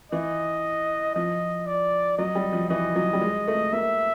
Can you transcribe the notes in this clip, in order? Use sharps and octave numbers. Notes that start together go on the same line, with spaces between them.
E3 D#5
F3 D#5
D5
F#3 D#5
G3
F3
E3 D#5
F#3
G3
G#3
A3
A#3 E5